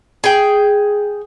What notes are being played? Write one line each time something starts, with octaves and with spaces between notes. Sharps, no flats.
G#4 G5